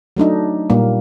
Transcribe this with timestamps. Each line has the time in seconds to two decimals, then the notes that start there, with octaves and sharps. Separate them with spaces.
0.17 F#3 A3 D4 D#4
0.70 A#2 G3 A#3